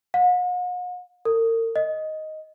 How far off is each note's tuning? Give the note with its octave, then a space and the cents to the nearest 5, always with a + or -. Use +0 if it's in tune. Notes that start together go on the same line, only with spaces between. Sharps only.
F#5 -45
A#4 -40
D#5 +5